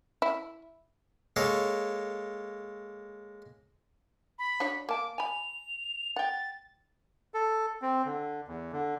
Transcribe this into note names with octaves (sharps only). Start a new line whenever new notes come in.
E4
G#3 A#3 A4 C#5
B5
D4 F#4 C#5
A#3 A5 D6
G#5 B5 F7
F#5 G5 A6
A4
C4
D3
E2
D3